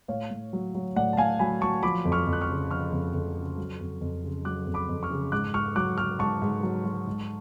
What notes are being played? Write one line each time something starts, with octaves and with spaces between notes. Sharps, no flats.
A2 C#5 F5
A2
F#3
F#3
A2 D5 F#5
A5
A2 F5 G#5
F#3 G#5 B5
F#3 A5 C#6
F3 B5 D6
F2
C#6 F6
F2
F#6
C#6 F6
C#3
F3 C#6 F6
F2
F2
C#3
F#3
F2
F2
C#3
F#3 D6 F#6
F2
B5 D6
F2
C#6 F6
C#3
G#2 D6 F#6
G#2 C#6 F6
F#3 D6 F#6
F#3 C#6 F6
G#2 A5 C#6
G#2
F#3
F#3
G#2